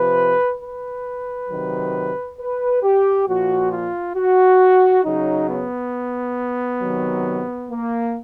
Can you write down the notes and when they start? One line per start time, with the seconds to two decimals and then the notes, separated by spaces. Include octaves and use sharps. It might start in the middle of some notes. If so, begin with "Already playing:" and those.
Already playing: C3 F3 B4
0.61 B4
1.50 C3 D#3 F#3
2.39 B4
2.83 G4
3.27 A#2 F3 F#4
3.72 F4
4.16 F#4
5.05 C#3 F#3 D#4
5.49 B3
6.82 C3 D#3 F#3
7.70 A#3